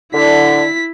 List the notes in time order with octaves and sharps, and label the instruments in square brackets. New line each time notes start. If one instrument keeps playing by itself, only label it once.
[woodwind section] D3 [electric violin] E4 B6